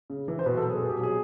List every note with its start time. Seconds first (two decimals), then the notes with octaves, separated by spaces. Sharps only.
0.10 C#3
0.28 E3
0.39 C5
0.46 B2 B4
0.57 A4
0.63 F#3
0.70 G#4
0.82 B2
0.89 G4
0.99 F#3 G#4